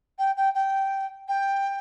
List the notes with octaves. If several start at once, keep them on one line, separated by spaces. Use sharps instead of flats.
G5
G5
G5
G5